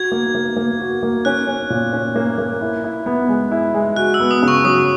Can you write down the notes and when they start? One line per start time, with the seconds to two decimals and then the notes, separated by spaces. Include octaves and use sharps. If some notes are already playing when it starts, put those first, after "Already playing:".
Already playing: F#4 G#6
0.12 A#3
0.35 A#3
0.57 A#3
0.80 F#4
1.03 A#3
1.25 C#4 F#6
1.47 C#4
1.70 A#2
1.93 C#4
2.16 A#3
2.38 A#3
2.61 E4
2.84 E4
3.06 B3
3.29 G#3
3.51 E4
3.74 G#3
3.96 F#4 F#6
4.14 E6
4.20 B3
4.31 D#6
4.43 C#3
4.48 C#6
4.64 F#3 D#6